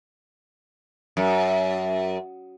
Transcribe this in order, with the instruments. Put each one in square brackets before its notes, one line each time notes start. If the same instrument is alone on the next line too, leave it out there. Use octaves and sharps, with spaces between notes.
[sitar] F#2